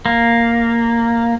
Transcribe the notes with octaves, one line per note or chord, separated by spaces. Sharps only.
A#3